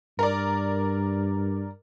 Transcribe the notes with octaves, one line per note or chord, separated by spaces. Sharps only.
G2 A#4 D5